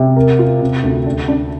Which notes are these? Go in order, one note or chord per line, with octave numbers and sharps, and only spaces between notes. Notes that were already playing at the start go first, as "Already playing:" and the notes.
Already playing: C3
A#4
F4
C3
D2
D4
D4